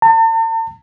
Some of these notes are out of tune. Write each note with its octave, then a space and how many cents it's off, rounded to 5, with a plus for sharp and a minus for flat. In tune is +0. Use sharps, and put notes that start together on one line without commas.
A5 +45